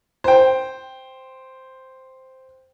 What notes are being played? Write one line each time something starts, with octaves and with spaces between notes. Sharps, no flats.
C5 G5